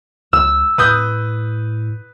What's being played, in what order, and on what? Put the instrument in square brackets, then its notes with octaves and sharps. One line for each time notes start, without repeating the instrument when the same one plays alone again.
[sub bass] C#2 [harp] E6
[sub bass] A2 [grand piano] B4 D#6 G6